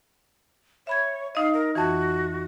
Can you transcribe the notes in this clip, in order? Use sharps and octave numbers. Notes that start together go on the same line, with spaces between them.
C#5 E5 B5 G#6
D#4 D#5 F5
A#4
F2 E3 F#4